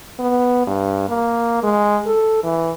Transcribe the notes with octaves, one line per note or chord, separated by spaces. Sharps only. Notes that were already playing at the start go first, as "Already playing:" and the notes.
B3
G2
A#3
G#3
A4
E3